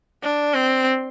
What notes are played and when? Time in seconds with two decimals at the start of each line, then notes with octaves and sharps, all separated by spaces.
0.23 D4
0.54 C4